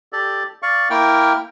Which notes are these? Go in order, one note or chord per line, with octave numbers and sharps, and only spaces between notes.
G4 A4 D5
D5 F5 C#6
A#3 E4 A#4 G5 F6